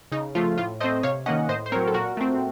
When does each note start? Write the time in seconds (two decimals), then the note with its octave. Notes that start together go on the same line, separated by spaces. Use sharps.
0.12 C#3 D#4
0.35 F3 A3 F4
0.58 A2 F4
0.80 A3 C5 D#5
0.84 C4
1.03 C3 C#5 F5
1.26 D#3 A#3 C#4 D#5 F#5
1.49 A2 C5 D#5
1.66 C5
1.72 C4 A#4 C#5
1.76 F#3
1.87 A4
1.94 A#2 F#4 A#4
2.17 A3 C4